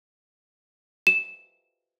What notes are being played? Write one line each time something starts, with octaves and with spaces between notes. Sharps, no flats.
E7